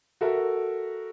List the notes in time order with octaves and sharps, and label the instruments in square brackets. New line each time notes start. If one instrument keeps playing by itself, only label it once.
[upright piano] F#4 A4 A#4 E5